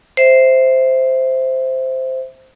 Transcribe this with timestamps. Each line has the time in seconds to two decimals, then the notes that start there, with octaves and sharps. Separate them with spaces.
0.17 C5 E5